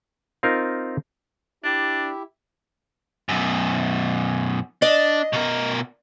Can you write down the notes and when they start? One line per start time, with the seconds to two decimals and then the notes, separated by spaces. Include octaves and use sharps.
0.43 C4 D#4 F4 A#4
1.64 D4 E4 G4 E5
3.29 F#2 B2
4.82 D4 D#5
5.33 B2 A#4